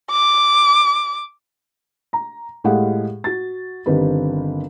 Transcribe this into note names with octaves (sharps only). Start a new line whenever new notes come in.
D6
A#5
A2 G#3 G4 G#4 F5 F#5
F#4 A6
G1 D#3 C4 G4 B4